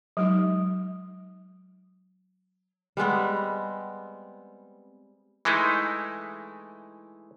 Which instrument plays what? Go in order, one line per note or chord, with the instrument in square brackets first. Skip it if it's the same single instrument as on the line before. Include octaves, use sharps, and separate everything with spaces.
[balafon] F#3 G#3 D#4
[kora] G3 G#3 B3 C4
[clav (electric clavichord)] E3 G#3 A3 D#4 E4